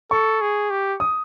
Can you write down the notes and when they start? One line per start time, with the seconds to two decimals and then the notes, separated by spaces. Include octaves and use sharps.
0.11 A4 C#6
0.41 G#4
0.71 G4
1.00 D#6